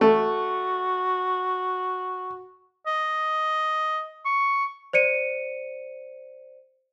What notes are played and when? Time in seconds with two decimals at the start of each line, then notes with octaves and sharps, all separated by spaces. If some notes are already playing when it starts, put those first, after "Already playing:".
0.01 A3 F#4
2.87 D#5
4.25 C#6
4.93 C5 D5 C#7 D#7